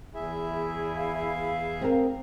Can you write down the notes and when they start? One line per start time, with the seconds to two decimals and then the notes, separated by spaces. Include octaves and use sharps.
0.15 E2 E4 G#4 E5
0.96 F5
1.81 C4 A#4